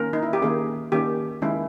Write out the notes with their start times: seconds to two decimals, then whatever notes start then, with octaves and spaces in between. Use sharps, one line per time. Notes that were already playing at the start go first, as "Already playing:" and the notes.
Already playing: D#3 A#3 C#4 A#4
0.13 D#4
0.23 E4
0.33 G4
0.42 D#3 A#3 C#4 G#4
0.92 D#3 A#3 C#4 G4
1.42 D#3 G#3 C#4 E4